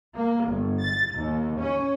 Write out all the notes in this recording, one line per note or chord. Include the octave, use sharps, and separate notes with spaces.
A#3
G1
A6
D#2
C#4